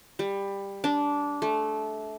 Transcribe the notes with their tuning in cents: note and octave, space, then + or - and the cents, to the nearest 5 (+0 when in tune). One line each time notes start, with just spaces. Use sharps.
G3 +15
D4 -15
A3 -20